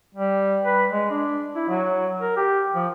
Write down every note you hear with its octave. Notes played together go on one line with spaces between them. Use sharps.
G3
B4
G#3
D4
E4
F#3
A#4
G4
F3